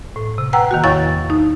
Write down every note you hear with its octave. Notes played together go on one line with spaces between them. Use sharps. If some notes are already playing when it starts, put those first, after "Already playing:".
A2
C3
B4 F#5 G5 A#5 E6
D#3 A#3 F#4
E2 E4 C#5 F5 C#6 A6
D#4